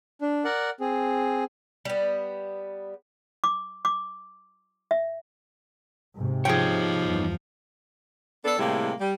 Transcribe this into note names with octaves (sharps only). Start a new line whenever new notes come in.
D4
A#4 D5 F#5
C4 G#4
G3 B3
D6
D6
E5
G#2 C3
F3 D#4 G#4 C#5 G5
E2 G2
B3 D4 A4
A2 C3 G3 G#3 A#3 E4
G3